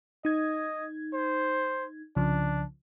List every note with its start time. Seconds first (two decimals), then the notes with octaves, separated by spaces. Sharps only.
0.25 D#4 D#5 G#6
1.14 C5
2.16 C2 C#3 F3 D4